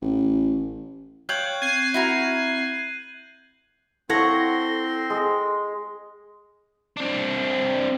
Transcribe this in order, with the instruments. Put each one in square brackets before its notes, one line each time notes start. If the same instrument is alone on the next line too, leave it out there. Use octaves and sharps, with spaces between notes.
[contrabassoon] A1
[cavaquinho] C#5 F5 G5 [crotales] F#6 G6 F#7
[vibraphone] C4 [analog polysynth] G#6 C7 [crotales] D#7
[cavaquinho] E4 F#4 A#4
[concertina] C4 C6 [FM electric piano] E4 A4 A#6 [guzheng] C#5 F#5
[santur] G#3
[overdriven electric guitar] C4 D4